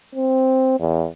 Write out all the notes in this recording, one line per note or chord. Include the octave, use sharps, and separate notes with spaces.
C4
E2